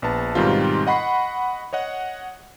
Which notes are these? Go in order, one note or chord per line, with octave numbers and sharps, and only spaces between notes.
A#1 B3 A5
G#2 B2 D#3 G3 C4 F4
D#5 F#5 B5 C#6 C7
C#5 D#5 F#5